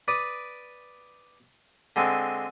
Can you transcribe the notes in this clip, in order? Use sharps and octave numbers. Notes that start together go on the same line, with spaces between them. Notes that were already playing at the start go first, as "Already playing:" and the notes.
B4 D5 D6 D#6
D3 G#3 C4